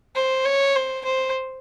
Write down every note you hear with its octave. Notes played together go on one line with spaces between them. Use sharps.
C5
C#5
C5
C5